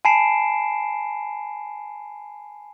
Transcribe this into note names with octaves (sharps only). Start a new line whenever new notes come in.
G#5 A5 B5 C7 D7 E7